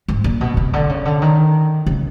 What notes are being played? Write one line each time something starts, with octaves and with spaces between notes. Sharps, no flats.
G#2
A#2
B2
C3
D3
C#3
D3
D#3
C#3